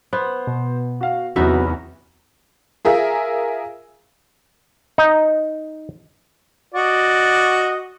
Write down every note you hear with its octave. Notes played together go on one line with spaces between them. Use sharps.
B3 C5
B2
F#4 F5
E2 C3 F#3 B3 D#4 F#4 E5
F4 G#4 A#4 E5
D#4
F#4 D5 D#5